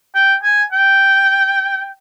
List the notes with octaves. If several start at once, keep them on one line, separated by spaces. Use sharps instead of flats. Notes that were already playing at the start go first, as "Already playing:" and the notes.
G5
G#5
G5